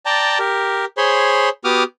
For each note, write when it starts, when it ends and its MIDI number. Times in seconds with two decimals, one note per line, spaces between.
0.06 0.38 74
0.06 0.38 79
0.06 0.38 81
0.06 0.38 82
0.39 0.85 67
0.39 0.85 70
0.97 1.49 68
0.97 1.49 72
0.97 1.49 73
0.97 1.49 83
0.97 1.49 84
1.64 1.83 59
1.64 1.83 66
1.64 1.83 67
1.64 1.83 86
1.64 1.83 87
1.64 1.83 89